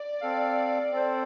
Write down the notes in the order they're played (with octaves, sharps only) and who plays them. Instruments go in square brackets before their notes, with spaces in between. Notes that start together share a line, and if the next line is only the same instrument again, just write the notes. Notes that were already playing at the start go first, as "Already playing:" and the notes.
Already playing: [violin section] D5
[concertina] C4 A4 F5
C4 A4 C5